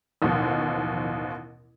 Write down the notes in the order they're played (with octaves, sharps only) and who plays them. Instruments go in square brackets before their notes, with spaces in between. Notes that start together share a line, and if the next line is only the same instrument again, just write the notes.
[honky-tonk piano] A1 D#2 B2 F3